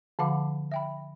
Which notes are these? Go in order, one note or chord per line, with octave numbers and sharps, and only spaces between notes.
D3 F3 F5 F#5 B5 D6
E5 G5 B5